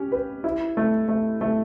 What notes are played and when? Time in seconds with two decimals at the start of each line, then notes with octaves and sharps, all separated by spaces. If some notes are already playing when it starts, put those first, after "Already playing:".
Already playing: C#4 G4
0.12 B4
0.44 E4
0.77 A3
1.08 A3
1.41 A3